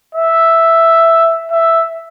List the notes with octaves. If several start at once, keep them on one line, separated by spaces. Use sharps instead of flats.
E5
E5